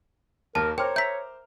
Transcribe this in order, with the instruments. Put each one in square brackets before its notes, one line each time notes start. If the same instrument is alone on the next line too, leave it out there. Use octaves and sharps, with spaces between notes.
[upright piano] D#2 A#3 [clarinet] A#4 [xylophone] A5
[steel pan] A#4 A#5 [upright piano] C5 D6 F6 [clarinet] C#5 [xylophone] G5
[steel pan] E5 A#5 E6 [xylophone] G6 B6